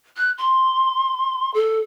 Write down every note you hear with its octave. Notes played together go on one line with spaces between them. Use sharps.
F#6
C6
A4